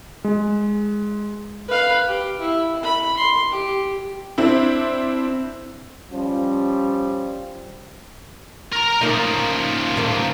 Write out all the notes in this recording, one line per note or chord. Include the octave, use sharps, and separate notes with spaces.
G#3
B4 F5
G4
E4
B5
C6
G4
C4 D4 E4
F3 G3 C#4
A#4 A#5
C#3 F3 A#3 D#4
G2 D#3 A#3